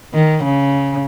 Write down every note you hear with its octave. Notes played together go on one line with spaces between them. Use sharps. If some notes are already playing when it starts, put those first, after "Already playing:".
D#3
C#3